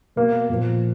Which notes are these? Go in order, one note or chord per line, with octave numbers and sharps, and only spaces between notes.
B2 A#3
A#2 F3